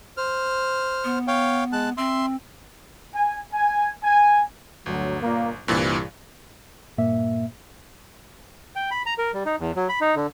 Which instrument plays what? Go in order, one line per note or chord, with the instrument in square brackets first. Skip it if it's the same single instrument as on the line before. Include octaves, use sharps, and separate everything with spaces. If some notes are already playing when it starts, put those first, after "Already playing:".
[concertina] C5 F6
[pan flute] B3
[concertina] C#5 F5 G5
G#3 A5 F#6
[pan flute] C4 [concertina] E5 C6
[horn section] G#5
G#5
G#5
[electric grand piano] G1 [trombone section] D2 F#3
[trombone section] A#2 A#3
[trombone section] C2 [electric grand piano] G2 A#2 E3
[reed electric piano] G2 A#2 A#3 E5
[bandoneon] G5
B5
A#5
A#4
G3
D#4
E2
F#3
B5
D#4
D3